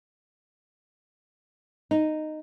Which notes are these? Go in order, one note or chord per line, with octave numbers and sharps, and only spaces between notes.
D#4